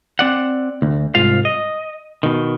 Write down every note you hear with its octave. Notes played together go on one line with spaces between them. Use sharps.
C4 D5 F#5
D2
C2 G#2 F4 F5
D#5
B2 D#3